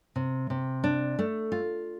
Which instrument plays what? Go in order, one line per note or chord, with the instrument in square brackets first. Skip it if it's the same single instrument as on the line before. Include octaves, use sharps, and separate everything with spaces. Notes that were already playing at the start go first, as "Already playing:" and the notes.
[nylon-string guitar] C3
C3
D4
A3
F4